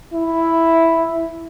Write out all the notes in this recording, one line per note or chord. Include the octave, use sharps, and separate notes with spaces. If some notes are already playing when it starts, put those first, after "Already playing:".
E4